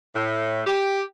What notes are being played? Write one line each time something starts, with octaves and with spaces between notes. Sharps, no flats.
A2
G4